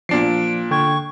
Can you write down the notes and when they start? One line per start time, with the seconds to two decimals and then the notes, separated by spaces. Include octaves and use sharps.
0.09 A#2 F3 D4 C7 D7
0.71 D3 G5 C#6 G#6